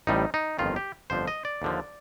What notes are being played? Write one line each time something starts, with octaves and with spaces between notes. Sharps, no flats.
A1 A2 G3 D#4
D#4
G1 F2 D#3 F4
G4
G1 F2 D3 F3 C5
D#5
D5
D#2 D3 F3